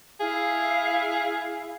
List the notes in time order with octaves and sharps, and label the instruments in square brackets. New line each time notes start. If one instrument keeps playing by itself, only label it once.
[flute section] E4 F5 [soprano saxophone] G#4